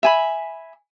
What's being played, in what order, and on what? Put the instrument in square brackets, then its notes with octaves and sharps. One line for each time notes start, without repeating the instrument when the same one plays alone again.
[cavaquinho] E5 G#5 B5